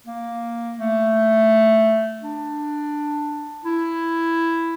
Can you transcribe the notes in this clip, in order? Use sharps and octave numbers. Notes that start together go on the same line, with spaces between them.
A#3
A3
D4
E4